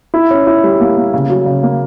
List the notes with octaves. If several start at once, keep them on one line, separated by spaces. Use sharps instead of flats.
E4
C#4
E4
G3
A#3
A#3
C#3
F#3
C#3
A#3